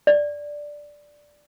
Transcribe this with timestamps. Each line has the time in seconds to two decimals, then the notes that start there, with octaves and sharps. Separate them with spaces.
0.07 D5